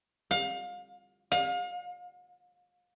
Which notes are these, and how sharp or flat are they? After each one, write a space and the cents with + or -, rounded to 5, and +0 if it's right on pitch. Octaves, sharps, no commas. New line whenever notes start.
F5 +30
F5 +35